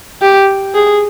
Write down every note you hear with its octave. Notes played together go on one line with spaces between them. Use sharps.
G4
G#4